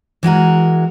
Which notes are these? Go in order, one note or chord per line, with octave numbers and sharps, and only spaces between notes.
E3 G#3 F#4 A#4